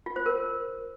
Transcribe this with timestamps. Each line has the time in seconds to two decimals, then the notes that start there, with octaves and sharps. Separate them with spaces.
0.06 F4
0.16 C5
0.26 A#4